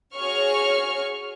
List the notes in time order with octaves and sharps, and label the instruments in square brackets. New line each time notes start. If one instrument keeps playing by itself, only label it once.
[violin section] F#4 G#4 C#5 C#6 F6